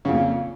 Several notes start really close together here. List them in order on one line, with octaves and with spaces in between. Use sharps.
C#3 F2 A#2